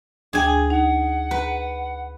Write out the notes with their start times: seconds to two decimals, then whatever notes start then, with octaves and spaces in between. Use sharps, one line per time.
0.33 D2 D4 G#4 G5 G#5
0.70 D#4 F#5
1.31 B4